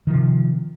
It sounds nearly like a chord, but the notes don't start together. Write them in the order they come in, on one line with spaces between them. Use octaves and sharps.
D#3 F3 C3